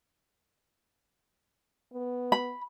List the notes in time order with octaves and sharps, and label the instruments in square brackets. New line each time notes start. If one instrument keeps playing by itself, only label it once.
[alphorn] B3
[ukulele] B5